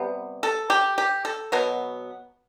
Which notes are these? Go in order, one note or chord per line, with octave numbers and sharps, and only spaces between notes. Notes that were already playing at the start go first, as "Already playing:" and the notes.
Already playing: C3 G3 B3
A4
G4
G4
A4
B2 F#3 B3